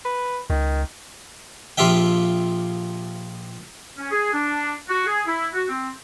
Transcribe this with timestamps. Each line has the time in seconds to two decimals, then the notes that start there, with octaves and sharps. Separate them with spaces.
0.05 B4
0.50 C#2 D#3
1.78 A#1 F3 F4 G4 E5 G5
3.98 C#4
4.11 G#4
4.33 D4
4.89 F#4
5.07 G#4
5.27 E4
5.54 F#4
5.69 C4